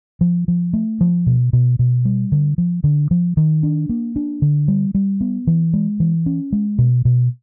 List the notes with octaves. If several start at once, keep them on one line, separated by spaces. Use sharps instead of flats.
F3
F3
A3
F3
B2
B2
B2
G3
D3
F3
D3
F3
D#3
D4
A#3
D4
D3
G3
G3
B3
E3
G#3
E3
C#4
G#3
B2
B2